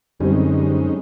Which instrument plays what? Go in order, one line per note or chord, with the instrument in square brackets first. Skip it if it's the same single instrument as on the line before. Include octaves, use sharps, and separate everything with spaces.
[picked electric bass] F#2 [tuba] D3 [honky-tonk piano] G3 C4 [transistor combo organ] G#3 C#4 D#4